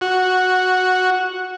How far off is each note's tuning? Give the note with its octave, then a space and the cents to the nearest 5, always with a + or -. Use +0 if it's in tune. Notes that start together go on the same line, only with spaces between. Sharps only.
F#4 -5